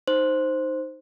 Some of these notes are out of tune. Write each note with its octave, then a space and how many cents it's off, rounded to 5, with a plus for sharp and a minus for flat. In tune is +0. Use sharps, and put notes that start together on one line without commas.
D#4 +0 C5 +0